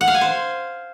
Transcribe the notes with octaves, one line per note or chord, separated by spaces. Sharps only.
F#5
F5
G#5
C5